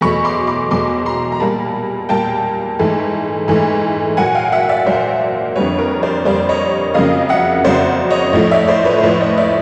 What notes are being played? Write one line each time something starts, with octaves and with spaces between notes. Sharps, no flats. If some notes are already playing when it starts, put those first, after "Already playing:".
E2 B2 F#3 A3 B5 C#6
C6 D6
C6 D6
E2 B2 F#3 A3 C6 D6
A#5 C6
A#5
A#2 G3 A#3 A5 B5
A#2 G3 A#3 G5 A5
G#2 E3 A3
G#2 E3 A3
A#2 F#3 A#3 F#5 G#5
F5 G5
E5 F#5
D5 E5
A#2 F#3 A#3 C5 D5
F2 D3 G3 A#3 B4 C#5
A#4
C5 D5
F2 D3 G3 A#3 C5 D5
C#5 D#5
F2 C#3 F#3 A#3 D#5 F5
E5 F#5
F2 C#3 F#3 A#3 C5 D5
C#5 D#5
A2 F3 A3 C#5 D#5
D5 E5
C5 D5
B4 C#5
C5
A2 F3 A3 B4 C#5
C#5 D#5
D5 E5